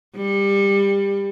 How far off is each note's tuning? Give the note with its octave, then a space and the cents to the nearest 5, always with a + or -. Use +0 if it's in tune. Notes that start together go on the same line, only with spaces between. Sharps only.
G3 +20